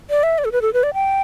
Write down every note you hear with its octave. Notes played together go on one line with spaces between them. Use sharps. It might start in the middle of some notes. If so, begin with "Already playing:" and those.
D5
E5
D5
A4
B4
A4
B4
D5
G5